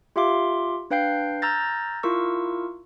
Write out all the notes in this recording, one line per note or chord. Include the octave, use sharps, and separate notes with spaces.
F4 G4 E5 F5 C6 D6
D4 B4 F5 G5 G6 C7
A#5 E6 F6 G6 A6 A#6
E4 F4 A#4 C#6 E6